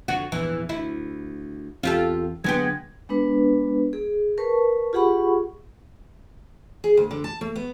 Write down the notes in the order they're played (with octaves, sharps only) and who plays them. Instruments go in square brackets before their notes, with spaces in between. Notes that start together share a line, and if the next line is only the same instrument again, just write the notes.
[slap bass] F2 D3 [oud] F#4
[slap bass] A#1 E2 G#2 [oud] E3
[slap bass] D2 [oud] E4
[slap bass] E2 C4 [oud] F4 G4 A4
[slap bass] D3 F#3 [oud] G#3 B3 G4 [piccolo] G#6
[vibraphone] G#3 B3 D4 B4
G#4
A#4 B4 A5 C#6
F4 G4 G#4 F#5 B5 C#6
[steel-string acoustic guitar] G#4
D2
D3
A5
A3
B3